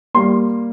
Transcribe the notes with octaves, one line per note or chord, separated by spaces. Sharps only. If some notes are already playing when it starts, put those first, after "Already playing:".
G3 A#3 C6